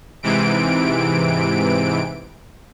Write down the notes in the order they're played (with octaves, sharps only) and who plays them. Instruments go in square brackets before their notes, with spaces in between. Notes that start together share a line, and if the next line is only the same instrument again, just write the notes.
[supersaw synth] G#2 C3 E3 D7